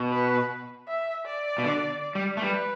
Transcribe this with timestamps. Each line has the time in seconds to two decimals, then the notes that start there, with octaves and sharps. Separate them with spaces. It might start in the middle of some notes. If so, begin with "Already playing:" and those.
Already playing: B2
0.12 B4
0.88 E5
1.26 D5
1.58 B2
1.64 D3
2.15 G3
2.37 A3
2.41 G3 B4